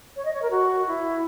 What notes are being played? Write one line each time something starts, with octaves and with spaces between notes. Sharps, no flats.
C#5
D#5
C#5
A#4
F#4
E4